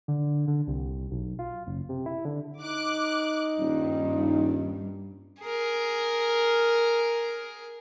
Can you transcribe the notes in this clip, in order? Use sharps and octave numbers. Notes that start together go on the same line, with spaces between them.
D3
D3
C2
B1
F4
F#1
C3
E4
D3
D#4 D6 F#6
D#1 G2
G#4 A#4